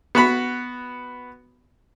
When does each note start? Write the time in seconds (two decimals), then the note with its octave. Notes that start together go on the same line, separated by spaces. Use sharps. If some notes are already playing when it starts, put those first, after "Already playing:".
0.15 B3 F#4 B5